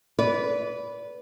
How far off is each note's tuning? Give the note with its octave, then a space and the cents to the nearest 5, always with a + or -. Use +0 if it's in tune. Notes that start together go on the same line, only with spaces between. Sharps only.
B4 +0 D5 -30